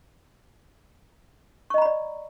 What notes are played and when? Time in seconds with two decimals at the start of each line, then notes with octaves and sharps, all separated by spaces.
1.70 C#6
1.74 D#5
1.78 A#5
1.82 B5
1.85 D5